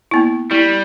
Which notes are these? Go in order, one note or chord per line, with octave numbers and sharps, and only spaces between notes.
A#3 B3 E4
G3 E4